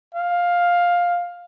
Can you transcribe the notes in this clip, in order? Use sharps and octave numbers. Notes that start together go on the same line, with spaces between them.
F5